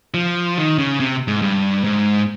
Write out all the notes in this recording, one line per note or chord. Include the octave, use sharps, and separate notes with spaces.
F3
D#3
C#3
C3
G#2
G2
G#2